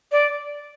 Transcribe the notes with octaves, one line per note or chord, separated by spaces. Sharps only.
D5